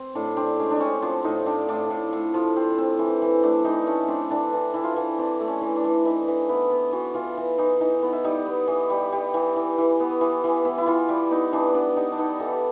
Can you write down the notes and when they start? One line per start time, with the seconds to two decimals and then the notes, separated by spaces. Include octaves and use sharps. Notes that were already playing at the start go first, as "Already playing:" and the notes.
Already playing: C4
0.15 A2 D4
0.37 C4 D4
0.59 G#3 C#4
0.71 D4
0.80 C4 C#4
1.02 F3 D4
1.24 A2 D#4
1.46 C4 D4
1.69 A2 D4
1.90 A2
2.13 A2
2.34 F3
2.56 C4
2.78 C4
2.99 E3
3.22 E3
3.43 A3 D4
3.64 E3 D#4
3.87 A3 C#4
4.08 C4 D4
4.30 E3 D4
4.53 E3
4.74 E3 E4
4.84 F4
4.94 E3 E4
5.18 C4 D4
5.40 A3
5.48 C#4
5.61 E3
5.76 D4
5.84 E3
6.05 E3 D#4
6.28 E3
6.49 B3 E4
6.71 B3
6.93 E3 F#4
7.14 E3 F4
7.38 E3
7.58 E3 D#4
7.81 E3 D#4
8.02 B3
8.13 E4
8.24 G3 D#4
8.46 B3
8.68 E3
8.90 G3
9.12 G3
9.34 E3
9.56 E3
9.78 E3
10.00 B3
10.21 E3
10.44 E3
10.65 B3 E4
10.78 E4
10.86 E3 F4
11.09 G3 E4
11.31 B3 D#4
11.52 E3 D4
11.74 B3 D4
11.96 G3 D#4
12.12 D4
12.18 B3 D#4
12.40 E3 A4
12.52 G4